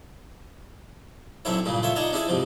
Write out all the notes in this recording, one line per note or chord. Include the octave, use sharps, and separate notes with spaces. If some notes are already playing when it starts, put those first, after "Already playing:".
B1 F#2 C4 D4 E4 C#5
G2 A#2 C#3 G3
F4 A4 C#5 E5
D4 D#4 F4 C#5 A5 A#5
C#4 D4 E4 G#4 A4 D5
G#2 C3 F3